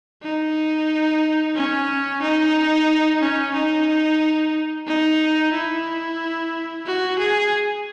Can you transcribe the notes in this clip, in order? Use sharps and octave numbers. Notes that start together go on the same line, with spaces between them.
D#4
C#4
D#4
C#4
D#4
D#4
E4
F#4
G#4